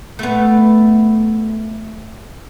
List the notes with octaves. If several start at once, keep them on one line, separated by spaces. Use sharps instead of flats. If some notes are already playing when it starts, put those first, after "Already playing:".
A3 B3